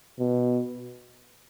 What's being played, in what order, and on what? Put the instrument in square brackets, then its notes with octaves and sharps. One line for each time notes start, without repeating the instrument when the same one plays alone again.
[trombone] B2